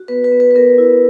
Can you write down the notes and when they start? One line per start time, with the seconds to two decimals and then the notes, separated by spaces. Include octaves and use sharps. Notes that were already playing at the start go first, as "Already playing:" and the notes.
Already playing: F#4
0.08 B3 B4
0.24 B4
0.32 B3
0.40 B4
0.51 B4
0.55 B3 A#4
0.78 E4